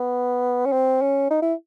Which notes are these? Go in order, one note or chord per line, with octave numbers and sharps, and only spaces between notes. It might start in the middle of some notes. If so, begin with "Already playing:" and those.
Already playing: B3
C#4
C4
C#4
D#4
E4